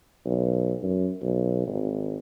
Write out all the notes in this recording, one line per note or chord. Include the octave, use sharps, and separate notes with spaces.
B1
F#2
B1
G#1